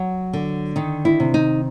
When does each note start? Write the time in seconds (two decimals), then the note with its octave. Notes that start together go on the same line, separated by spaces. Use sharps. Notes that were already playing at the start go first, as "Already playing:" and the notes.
Already playing: F#3
0.33 D3
0.76 D#3 D#4
1.05 E4
1.20 C3
1.34 D#4